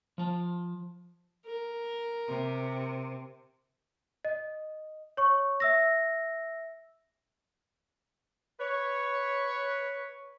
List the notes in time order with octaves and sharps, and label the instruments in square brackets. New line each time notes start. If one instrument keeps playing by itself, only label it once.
[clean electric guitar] F3 A5
[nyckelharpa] A#4
[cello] C3
[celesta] D#5
C#5 C#6
E5 E6 A#6
[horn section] B4 C#5